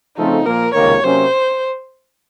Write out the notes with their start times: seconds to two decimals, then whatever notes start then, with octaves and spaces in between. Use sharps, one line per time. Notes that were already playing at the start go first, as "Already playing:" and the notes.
0.17 C#3 F3 A3 C4 D#4 F4
0.46 A#2 F3 A#3 A#4
0.74 C#2 C3 D#3 A#3 C#5
1.03 C3 F#3 A#3 C#4 C5